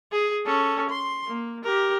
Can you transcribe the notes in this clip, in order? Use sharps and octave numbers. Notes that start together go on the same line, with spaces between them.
G#4
C#4 A4
C6
A#3
G4 A#4